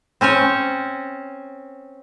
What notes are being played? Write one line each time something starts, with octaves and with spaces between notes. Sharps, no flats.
C4 C#4 C5 C#5